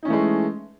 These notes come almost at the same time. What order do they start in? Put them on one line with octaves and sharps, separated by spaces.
D#4 C#4 E3 A3 G#3